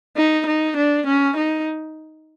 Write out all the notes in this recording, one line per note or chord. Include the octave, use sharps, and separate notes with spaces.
D#4
D#4
D4
C#4
D#4